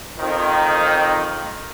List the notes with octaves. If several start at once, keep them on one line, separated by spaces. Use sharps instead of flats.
F2 D#3